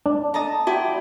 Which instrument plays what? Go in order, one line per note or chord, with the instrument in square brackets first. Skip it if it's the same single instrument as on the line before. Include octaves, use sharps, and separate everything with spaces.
[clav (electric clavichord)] D4
[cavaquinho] D#5 A5 A#5
[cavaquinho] E4 D5 G5 [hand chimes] F#4